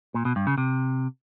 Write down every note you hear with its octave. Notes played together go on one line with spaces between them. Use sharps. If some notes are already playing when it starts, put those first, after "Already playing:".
A#2
B2
G2
C#3
C3